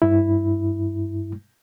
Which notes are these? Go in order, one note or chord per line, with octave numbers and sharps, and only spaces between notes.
G2 E4